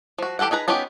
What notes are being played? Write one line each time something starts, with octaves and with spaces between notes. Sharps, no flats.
F3 F#4
E3 G4 A4 B4 F#5
D#4 G#4 B4 A#5
B3 C#4 D#4 F4 G4